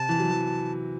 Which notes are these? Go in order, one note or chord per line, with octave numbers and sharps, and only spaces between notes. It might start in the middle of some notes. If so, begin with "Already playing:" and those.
Already playing: C3 A5
E3
F#3
E3